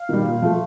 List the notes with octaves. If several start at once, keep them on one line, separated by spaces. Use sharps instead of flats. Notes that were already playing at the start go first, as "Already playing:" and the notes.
Already playing: F5
D#3 G3
A#2
F3 A3